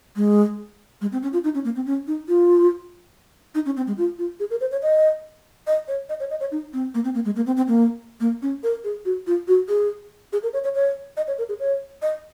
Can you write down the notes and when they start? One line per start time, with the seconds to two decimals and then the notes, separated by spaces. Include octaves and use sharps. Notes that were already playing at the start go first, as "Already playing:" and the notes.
0.16 G#3
1.01 G#3
1.12 C4
1.23 C#4
1.33 F4
1.44 D#4
1.55 C#4
1.65 A#3
1.76 C4
1.86 C#4
2.07 D#4
2.28 F4
3.55 D#4
3.66 C#4
3.77 C4
3.87 G#3
3.98 F4
4.19 F4
4.40 G#4
4.51 A#4
4.61 C5
4.72 C#5
4.82 D#5
5.67 D#5
5.88 C#5
6.09 D#5
6.20 C#5
6.30 D#5
6.41 C#5
6.52 D#4
6.73 C4
6.94 A#3
7.04 C4
7.15 A#3
7.25 G#3
7.36 A#3
7.46 C4
7.57 C4
7.68 A#3
8.20 A#3
8.42 C#4
8.63 A#4
8.84 G#4
9.05 F#4
9.27 F4
9.48 F#4
9.69 G#4
10.33 G#4
10.43 A#4
10.53 C#5
10.64 C#5
10.75 C#5
11.17 D#5
11.28 C#5
11.38 A#4
11.49 G#4
11.60 C#5
12.02 D#5